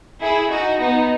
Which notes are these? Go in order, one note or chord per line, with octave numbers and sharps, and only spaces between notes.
E4 G#4
D#4 F#4
B3 D#4